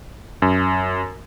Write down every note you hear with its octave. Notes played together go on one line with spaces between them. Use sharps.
F#2